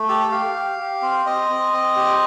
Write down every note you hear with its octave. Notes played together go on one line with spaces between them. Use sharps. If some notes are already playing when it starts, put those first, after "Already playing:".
Already playing: A3
G4 A4
G4 F5
G4
G4
C4
C4 D#5
C4
C4
G4